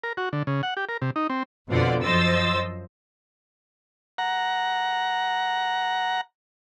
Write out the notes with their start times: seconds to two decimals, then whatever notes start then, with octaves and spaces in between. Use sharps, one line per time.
0.03 A#4
0.17 F#4
0.33 D3
0.47 C#3
0.63 F#5
0.77 G4
0.89 A#4
1.02 C3
1.16 D#4
1.30 C4
1.69 F2 B2 D3 F4 D5 F#5
2.03 F#2 F3 C5 D#5 E6 A6
4.18 F#5 A#5